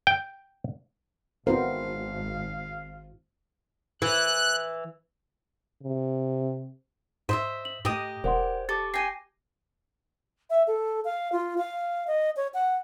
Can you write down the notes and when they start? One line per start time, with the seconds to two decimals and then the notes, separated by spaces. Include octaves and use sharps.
0.07 G5
1.47 G#1 B3 C4 E4 F#4 A#4 C5 F5
4.02 E3 F#6
5.83 C3
7.29 G#2 C5 D#5 E5 B6
7.65 F#7
7.85 G#2 A3 G4 D#5 D#6 A#6
8.24 E1 A#4 C5 D5 F#5 C6
8.69 G4 A4 A5 D6 A6
8.94 G5 G#5 A#6 C7 D#7
10.50 E5
10.67 A4
11.05 F5
11.32 F4
11.58 F5
12.07 D#5
12.37 C#5
12.54 F#5